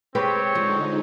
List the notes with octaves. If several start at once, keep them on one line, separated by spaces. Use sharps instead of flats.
G#3 C4 G4 B4 C#5
D3 F3 G#3 D#4